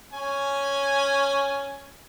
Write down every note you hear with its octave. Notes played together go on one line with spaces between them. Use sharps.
C#4 G#5